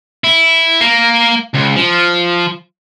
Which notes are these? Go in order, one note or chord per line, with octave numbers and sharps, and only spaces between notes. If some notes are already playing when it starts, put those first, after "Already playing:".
E4
A#3
C#2
F3